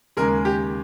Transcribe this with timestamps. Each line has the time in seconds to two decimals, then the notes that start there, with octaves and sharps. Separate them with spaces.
0.17 D#2 C#3 G#3 A#4
0.45 G4